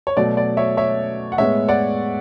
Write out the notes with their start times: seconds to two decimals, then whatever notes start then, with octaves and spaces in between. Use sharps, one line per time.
0.07 C#5
0.17 B2 F#3 A3 D5
0.37 D5
0.57 C#5 E5
0.77 C#5 E5
1.32 F#5
1.38 A2 G#3 B3 C#5 E5
1.68 D5 F#5